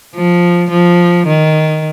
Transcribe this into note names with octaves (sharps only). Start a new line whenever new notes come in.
F3
F3
D#3